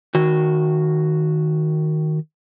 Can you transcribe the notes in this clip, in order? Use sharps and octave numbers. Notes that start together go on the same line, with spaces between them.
D#3 F#4